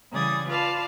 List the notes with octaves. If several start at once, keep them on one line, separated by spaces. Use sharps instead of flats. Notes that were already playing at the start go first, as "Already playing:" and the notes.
C#3 E3 G3 D5 D#6 G#6
F4 B4 D5 F5 A5